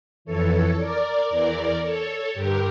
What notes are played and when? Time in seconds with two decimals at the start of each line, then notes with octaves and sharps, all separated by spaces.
0.25 F2 E3 A4 C#5
0.77 A#4 D5
1.29 E2 E3 A#4 D5
1.81 A4 C#5
2.34 G2 D3 G4 A#4